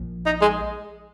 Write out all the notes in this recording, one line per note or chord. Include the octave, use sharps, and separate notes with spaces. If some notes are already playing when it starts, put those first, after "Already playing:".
Already playing: A#1 A#2 F3
D#4
G#3